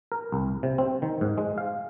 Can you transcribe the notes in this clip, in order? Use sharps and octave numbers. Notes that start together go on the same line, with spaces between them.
A#4
C2
C3
C4
D#3
G#2
G#3
F5